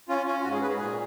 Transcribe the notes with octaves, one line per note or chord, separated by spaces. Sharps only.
C#4 F4
C#4 F4
G#2 F#4
G#4
G#2 B4
G#4
A#2